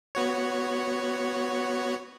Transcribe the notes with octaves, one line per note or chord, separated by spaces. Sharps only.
B3 F#4 C#5